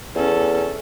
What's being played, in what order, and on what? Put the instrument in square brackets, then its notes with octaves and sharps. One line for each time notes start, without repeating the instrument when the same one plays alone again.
[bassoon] E2 [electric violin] C#4 A4